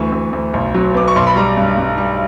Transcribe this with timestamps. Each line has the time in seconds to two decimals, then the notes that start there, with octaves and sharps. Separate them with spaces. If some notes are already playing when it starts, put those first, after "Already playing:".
Already playing: D2 E3 C#6
0.12 D2
0.33 D2
0.53 B1
0.74 F#3
0.94 B3 D6
1.08 C#6
1.16 B1 C6
1.27 B5
1.36 G3 A#5
1.57 G2
1.78 G2
1.98 G3